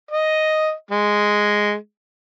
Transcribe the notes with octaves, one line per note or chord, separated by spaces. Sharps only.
D#5
G#3